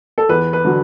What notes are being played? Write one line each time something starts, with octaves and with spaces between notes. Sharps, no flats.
A4
E2 B4
B4
D3 F#3